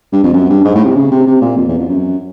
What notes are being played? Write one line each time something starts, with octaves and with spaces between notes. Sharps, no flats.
G2
F2
F#2
G2
G#2
A2
C3
C#3
C3
C3
A#2
F2
E2
F2
F#2